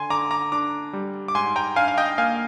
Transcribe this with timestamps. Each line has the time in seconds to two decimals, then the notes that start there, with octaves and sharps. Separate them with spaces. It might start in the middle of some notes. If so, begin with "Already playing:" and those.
Already playing: D3 G#5 C6
0.10 D3 A#5 D6
0.31 A#5 D6
0.52 D4 A#5 D6
0.93 G3
1.28 D6
1.35 G#2 G#5 C6
1.56 G5 A#5
1.76 D4 F5 G#5
1.88 F5
1.98 D#5 G5
2.18 A#3 F5 G#5